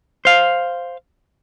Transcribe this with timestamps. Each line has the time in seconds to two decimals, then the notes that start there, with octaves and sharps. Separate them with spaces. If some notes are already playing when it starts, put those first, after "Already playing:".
0.25 C5 F5